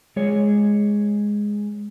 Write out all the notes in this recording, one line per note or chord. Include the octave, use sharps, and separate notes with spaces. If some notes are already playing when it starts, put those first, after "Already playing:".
G#3 G#4 C#5